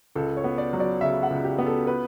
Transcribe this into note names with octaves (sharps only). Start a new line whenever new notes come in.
C#2 A4
C#5
B3
D5
F#3
D5
C#3 E5
F#5
C#2
G4
B3
A4
B4